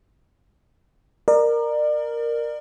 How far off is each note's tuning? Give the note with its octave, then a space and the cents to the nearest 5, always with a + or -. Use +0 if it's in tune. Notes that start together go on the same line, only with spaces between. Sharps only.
A#4 +0 D5 +35